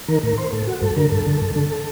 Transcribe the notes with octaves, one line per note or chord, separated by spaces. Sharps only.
D#3 A#4
A2 A#4
C5
A2 A4
F#4
G2 A4
D3 A#4
G2 A4
D3
G2
D3